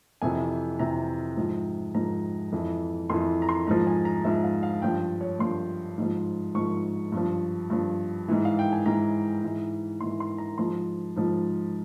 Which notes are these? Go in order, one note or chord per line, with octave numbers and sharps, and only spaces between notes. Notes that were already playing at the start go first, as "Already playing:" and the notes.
F2 C3 E3 G#5
F2 C3 E3 A#5
G#2 F3
G#2 F3 A#5
F2 E3
F2 E3 C6
A#5
C6
G#2 F3 A#5
G#5
A#5
G#2 F3 E5
F5
F5
G2 F3 G5
C#5
G2 F3 C6
G#2 F3
G#2 F3 C#6
G2 F3
G2 F3
G#2 E3
F5
G5
G#5
G#2 E3 A#5
G#2 E3
G#2 E3 C6
C6
A#5
G#2 F3 C6
G#2 F3